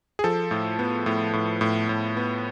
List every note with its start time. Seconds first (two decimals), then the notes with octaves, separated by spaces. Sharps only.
0.19 G#4
0.24 F3 A4
0.51 A2
0.79 B3
1.06 A2
1.33 A2
1.61 A2
1.89 A2
2.17 B3